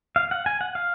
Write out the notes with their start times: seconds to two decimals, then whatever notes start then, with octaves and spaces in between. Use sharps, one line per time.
0.16 F5
0.31 F#5
0.46 G#5
0.61 F#5
0.75 F5